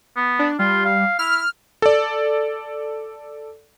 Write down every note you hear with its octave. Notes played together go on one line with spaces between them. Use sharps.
B3
D4
G3 F4
F5
E4 F6
A4 D5